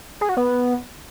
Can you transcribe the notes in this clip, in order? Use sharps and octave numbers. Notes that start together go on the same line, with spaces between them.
G#4
F#4
B3